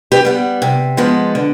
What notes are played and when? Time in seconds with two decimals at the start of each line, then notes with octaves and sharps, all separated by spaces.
0.12 G4 B4
0.25 G3 B3
0.62 C3
0.97 F3 G#3 B3
1.35 D3